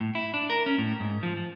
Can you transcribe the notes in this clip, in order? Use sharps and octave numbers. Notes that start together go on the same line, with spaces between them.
A2
E4
D4
A#4
C#4
A2
G#2
F3
F3